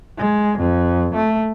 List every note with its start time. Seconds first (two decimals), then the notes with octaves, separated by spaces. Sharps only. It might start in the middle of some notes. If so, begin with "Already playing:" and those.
0.18 G#3
0.58 F2
1.15 A3